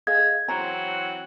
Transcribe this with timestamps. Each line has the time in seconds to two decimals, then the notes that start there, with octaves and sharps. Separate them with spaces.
0.07 G#4 D#5 F5 G#6
0.48 E3 F#3 C4 A#5